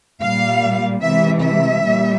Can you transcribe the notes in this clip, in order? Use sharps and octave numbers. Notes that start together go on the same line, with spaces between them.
A#2 G3 F5
C3 E3 G#3 E5
E5
A#2 G3